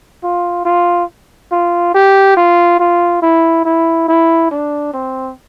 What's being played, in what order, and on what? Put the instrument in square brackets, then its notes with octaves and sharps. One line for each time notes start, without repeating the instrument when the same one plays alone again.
[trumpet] F4
F4
F4
G4
F4
F4
E4
E4
E4
D4
C4